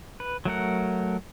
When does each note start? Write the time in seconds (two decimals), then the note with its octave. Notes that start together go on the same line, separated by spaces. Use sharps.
0.20 B4
0.45 F#3 A3 A#4 F#5